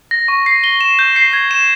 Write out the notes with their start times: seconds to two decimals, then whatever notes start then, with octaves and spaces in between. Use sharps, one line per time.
0.11 A#6
0.28 C#6
0.46 C7
0.64 G7
0.81 E7
0.99 G6
1.16 C7
1.33 G#6
1.51 E7